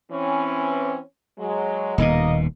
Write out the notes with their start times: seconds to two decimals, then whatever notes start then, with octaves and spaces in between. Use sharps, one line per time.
0.11 E3 C4 C#4
1.38 F#3 G#3
1.98 D#1 D#2 B2 A#3 D#5